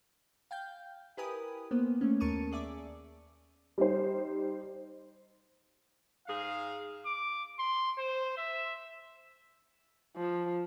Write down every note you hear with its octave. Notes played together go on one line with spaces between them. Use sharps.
F5 G5 G6
E4 G4 A#4 B4 G#5 D#6
A#3 B3 C5
A3 A#3 C#4
D#2 A#4 A5 C#6 C#7 D#7
G#4 D5 E5 D6
G3 D#4 C5
G#2 G#4 F5
D6
C6
C5
E5
F3